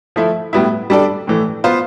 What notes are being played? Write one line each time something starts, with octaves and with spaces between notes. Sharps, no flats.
F3 A3 E4
A2 G3 B3 E4
G3 D4 A4 D5
A2 E3 A3
B3 F4 C5